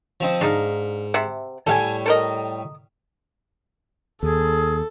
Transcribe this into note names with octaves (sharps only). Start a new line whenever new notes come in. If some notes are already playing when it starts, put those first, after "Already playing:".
F3 C4 D#4
G#2 D4 D#4 F5
C3 E5 F#5
A2 G3 A4 F5 G#5
A4 A#4 D#5
D#2 G#4 A4